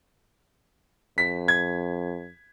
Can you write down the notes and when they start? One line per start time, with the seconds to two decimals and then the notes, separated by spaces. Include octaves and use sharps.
1.18 F2 B6
1.48 G#6